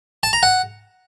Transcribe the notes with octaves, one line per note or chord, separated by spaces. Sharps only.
A5
A#5
F#5